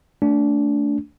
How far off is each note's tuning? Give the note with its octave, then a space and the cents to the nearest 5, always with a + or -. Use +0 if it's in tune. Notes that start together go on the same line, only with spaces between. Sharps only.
A3 +0 D4 -25